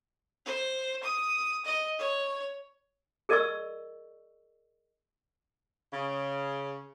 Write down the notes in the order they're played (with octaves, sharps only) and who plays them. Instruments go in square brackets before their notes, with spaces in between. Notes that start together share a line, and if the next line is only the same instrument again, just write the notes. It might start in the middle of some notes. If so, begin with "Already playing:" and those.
[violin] C5
D#6
D#5
C#5
[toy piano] G#4 A#4 D5 D#5 C#6 E6
[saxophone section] C#3